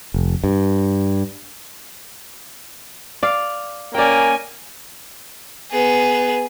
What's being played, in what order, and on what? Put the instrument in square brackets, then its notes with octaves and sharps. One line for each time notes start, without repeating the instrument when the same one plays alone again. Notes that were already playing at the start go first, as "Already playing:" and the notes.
[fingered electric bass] F1
G2
[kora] D5 F5
[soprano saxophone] A#3 [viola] C#4 G#5 [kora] D5 G5
[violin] B3 G#4